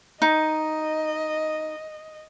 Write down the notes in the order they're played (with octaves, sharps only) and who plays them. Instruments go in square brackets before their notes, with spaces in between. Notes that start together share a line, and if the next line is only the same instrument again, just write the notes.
[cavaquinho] D#4 [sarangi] D#5